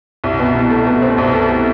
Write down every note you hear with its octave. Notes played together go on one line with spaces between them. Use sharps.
C2
B2
B2
A3
B2
C4
C2
A3